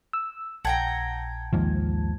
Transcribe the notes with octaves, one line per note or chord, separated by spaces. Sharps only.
E6
A#1 F#5 G5 A5 A#5 G#6
D#2 G#2 F3